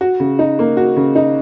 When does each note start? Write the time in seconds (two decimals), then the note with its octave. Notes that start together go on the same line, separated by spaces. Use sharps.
0.01 F#4
0.20 C#3
0.39 D#4
0.59 A#3
0.77 F#4
0.97 C#3
1.15 D#4